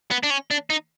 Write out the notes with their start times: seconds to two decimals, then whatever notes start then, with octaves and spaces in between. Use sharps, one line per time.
0.11 B3
0.23 D4
0.30 C#4
0.51 D4
0.70 D#4